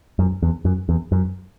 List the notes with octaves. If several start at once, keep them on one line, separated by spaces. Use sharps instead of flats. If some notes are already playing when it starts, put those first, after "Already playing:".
F#2
E2
F#2
E2
F#2